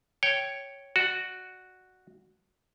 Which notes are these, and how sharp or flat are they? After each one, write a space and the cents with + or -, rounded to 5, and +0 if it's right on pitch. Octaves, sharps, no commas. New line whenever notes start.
C#5 +0 G5 -10
F#4 +0 D5 +30